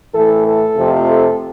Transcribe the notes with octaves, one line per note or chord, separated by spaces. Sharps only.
A2 E3 A3 A4
A4
F2 C3 F3 A3
A4